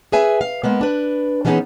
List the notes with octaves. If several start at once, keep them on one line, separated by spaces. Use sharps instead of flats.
G#4 B4 E5 G#5
F5
G#3 A#3 B3
D4 B4
E3 G3 B3 C#4 D#4 G#4